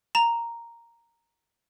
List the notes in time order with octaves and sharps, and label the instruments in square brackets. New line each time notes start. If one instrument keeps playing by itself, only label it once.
[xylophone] A#5 E7